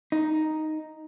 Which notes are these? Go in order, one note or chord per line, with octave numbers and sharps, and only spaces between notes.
D#4